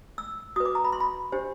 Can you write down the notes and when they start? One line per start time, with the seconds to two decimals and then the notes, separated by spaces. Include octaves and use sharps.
0.18 E6
0.56 F#4 D#6
0.60 B4
0.65 D6
0.75 A#5
0.84 B5
0.92 C6
1.00 B5
1.32 D4 G4 C5